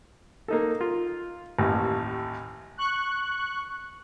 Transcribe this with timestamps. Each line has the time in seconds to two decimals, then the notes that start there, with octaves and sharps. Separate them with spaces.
0.48 A#3 D#4 A4
0.81 F4
1.59 A1 D#2 A2
2.78 C#6 F#6